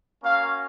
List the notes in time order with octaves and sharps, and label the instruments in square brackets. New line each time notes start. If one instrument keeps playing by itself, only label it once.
[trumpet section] A#3 C#4 F#4 F5